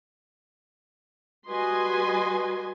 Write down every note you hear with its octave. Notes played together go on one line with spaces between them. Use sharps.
G3 F#4 B4 D#5 G#5 C6